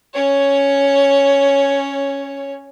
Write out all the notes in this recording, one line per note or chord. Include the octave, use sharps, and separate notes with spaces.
C#4 C#5